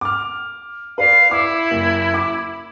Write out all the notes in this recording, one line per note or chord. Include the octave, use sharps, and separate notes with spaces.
D6 F6
B4 D5 F5
E4 D6
F#1
D6